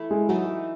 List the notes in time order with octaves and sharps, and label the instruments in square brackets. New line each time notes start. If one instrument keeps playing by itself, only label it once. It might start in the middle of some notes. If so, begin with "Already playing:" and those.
Already playing: [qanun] E3 A3 E4 A4
[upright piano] G#3
[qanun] E3 A3 D#4 A4 [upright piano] F#3